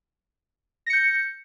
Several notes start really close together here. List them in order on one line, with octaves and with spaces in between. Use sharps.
A#6 C#7 G6